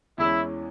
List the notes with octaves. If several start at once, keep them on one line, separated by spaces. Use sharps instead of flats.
E2 E3 G#3 C#4 E4